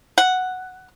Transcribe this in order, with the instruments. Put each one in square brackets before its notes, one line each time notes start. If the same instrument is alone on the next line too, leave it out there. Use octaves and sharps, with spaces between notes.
[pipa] F#5